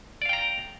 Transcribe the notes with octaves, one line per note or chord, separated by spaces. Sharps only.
D5 F5 G5 A#5